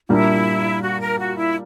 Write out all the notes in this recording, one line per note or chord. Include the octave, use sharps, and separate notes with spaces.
A#2 G3 A#3 D4 E4
F#4
A#4
F#4
E4